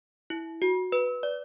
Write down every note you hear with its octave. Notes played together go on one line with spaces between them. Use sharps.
E4
F#4
B4
D5